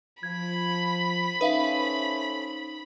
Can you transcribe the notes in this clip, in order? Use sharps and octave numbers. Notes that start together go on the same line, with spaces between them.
F3 B5 G#6
C#4 D#4 A4 B4 C5 E5 F5